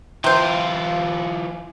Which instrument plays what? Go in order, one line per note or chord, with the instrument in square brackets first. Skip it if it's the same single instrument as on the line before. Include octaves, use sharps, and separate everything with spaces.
[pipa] C3 C5 [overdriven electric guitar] E3 F4